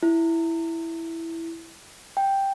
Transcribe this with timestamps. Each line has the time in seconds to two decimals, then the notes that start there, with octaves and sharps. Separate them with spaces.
0.03 E4
2.17 G5